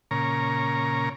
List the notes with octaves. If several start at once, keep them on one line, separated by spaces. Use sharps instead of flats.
A#2 C#3 A#4 C#5 A#5